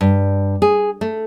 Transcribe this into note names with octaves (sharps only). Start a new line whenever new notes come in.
G2
G#4
A3